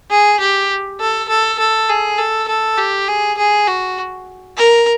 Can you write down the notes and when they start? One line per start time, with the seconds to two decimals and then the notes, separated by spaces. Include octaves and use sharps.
0.10 G#4
0.40 G4
1.00 A4
1.29 A4
1.59 A4
1.89 G#4
2.19 A4
2.48 A4
2.78 G4
3.08 G#4
3.38 G#4
3.68 F#4
4.57 A#4